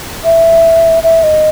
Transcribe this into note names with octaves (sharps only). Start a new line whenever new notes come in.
E5
E5
D#5